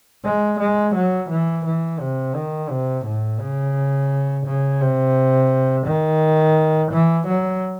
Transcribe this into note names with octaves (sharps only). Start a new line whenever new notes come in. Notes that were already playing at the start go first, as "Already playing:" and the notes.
G#3
G#3
F#3
E3
E3
C3
D#3
C3
A2
C#3
C#3
C3
D#3
E3
F#3